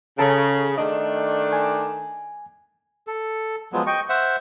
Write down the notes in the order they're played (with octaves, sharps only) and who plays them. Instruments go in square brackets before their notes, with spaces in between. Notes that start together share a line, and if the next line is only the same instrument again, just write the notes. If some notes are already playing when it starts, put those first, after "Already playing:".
[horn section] C#3 [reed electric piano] A4 A5 A#5
[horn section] D#3 A3 D4 [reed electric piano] D#5
[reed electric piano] G#5
[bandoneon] A4
F3 F#3 G#3 B3
D#5 G5 C#6
C5 E5 F#5